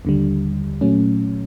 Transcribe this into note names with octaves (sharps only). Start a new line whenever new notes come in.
D#2 D3 G3
A#2 F#3 A3 C#4